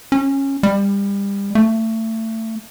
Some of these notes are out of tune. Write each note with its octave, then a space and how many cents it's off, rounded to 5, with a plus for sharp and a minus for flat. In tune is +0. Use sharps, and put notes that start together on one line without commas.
C#4 -15
G3 +30
A3 +25